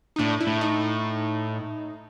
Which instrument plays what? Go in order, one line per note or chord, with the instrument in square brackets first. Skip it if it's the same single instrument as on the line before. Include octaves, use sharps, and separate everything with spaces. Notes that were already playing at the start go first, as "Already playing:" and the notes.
[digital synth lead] D#4
[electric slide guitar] A2 [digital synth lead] D4
[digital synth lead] E4
[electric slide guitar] A2
[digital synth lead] D#4